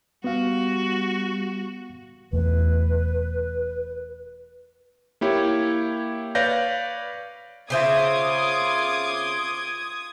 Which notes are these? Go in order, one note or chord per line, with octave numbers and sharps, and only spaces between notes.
G3 B3 F#4 F5
E1 E2 A3 B4
A#3 E4 G4 C#5
B4 C#5 D5 F5 G6 A#6
C#3 F4 C5 E5 D6 D#6 G#6